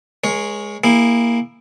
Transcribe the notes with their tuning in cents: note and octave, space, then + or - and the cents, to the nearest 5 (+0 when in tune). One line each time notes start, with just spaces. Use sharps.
G#3 +0 A#4 +35 C#5 -5
A#3 +5 E4 +0 G#4 -30